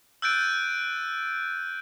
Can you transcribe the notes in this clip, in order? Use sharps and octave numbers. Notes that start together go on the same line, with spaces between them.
E6 F#6 G6 A6 D7 D#7